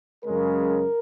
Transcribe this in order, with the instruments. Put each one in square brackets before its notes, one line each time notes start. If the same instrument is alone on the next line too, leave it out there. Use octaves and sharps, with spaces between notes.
[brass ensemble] F#2 C#3 G#3 C#4 A#4